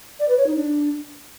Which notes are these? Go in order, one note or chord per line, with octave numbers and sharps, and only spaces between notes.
D5
B4
C#5
D#4
D4